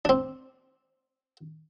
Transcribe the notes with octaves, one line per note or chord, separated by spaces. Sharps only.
C4 D4